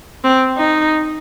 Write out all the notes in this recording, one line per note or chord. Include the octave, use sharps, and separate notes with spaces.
C4
D#4